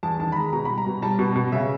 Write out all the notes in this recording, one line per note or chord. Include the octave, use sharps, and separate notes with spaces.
E2 A5
D#3 A5
B5
G#3 A#5
B2 A#5
G3 B5
A#5
B2
G3 A5
B2
B2
C#3 E5